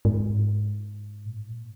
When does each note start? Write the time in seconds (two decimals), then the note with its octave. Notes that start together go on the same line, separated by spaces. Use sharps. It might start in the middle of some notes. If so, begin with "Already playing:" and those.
0.05 G#2
1.25 A#2
1.37 G#2
1.49 A#2